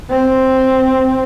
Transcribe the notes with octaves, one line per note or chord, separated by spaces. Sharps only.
C4